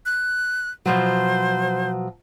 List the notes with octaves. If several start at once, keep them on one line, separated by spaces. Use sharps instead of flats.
F#6
B2 F3 F#3 C5